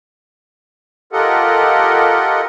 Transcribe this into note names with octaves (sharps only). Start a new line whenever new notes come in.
F4 G4 A4 A#4 D#5 F#5